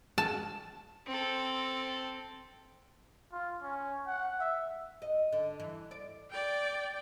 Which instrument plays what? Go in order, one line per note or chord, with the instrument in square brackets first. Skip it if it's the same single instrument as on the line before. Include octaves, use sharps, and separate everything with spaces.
[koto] A5
[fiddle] C4 A4
[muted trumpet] F4
C#4
F#5
E5
[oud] D#5
D3
E3
D5
[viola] D5 G5